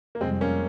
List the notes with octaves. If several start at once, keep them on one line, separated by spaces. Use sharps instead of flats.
A#3
F2 C3 G3 G#3 C4
A#3 C#4